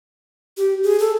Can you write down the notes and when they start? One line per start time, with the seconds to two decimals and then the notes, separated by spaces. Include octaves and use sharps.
0.57 G4
0.83 G#4
1.00 A4